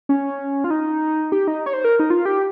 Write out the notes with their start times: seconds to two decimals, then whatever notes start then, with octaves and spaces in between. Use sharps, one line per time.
0.09 C#4
0.64 F4
0.71 D#4
1.32 G4
1.48 D#4
1.66 C#5
1.73 C5
1.84 A#4
2.00 D#4
2.10 F4
2.26 G4